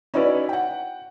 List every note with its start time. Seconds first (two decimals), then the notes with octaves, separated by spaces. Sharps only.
0.14 C#4 D#4 E4 F#4 B4 D5
0.49 F#5 G5